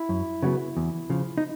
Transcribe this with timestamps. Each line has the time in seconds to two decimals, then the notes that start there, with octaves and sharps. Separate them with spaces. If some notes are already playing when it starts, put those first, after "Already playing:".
Already playing: E4
0.09 F#2
0.43 C#3 F#3 B3
0.77 E2
1.10 C#3 F3
1.38 D#4